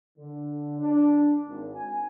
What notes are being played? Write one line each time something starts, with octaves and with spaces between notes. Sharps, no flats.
D3
D4
G#1
G#5